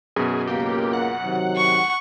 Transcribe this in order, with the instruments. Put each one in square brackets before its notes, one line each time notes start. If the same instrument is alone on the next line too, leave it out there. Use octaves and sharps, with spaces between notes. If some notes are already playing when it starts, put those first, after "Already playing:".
[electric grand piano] F#2 B2 [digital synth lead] G#4
[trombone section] C#2 A#3 [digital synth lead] G4
[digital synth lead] F#5
[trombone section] C3 D#3 F#3
[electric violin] C#6